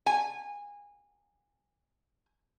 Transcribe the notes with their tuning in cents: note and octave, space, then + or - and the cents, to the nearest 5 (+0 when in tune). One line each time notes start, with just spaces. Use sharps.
G#5 -20